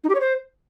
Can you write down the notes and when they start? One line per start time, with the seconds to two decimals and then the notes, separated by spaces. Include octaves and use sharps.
0.04 D#4
0.09 G4
0.15 C#5
0.20 C5